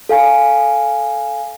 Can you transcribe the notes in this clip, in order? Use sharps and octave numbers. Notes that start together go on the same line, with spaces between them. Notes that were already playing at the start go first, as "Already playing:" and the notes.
A4 F5 G#5